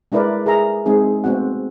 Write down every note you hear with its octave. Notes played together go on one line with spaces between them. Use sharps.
G#3 D4 E4 A#4 B4 D5
G#4 A#4 E5 A#5
G#3 C4 D#4 G#4
A3 B3 C4 F#4 F#5